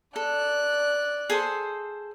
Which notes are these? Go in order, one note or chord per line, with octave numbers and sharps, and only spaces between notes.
A4 D5 F#6
G#4 A4 C5